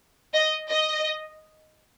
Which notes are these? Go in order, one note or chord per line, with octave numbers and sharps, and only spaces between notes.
D#5
D#5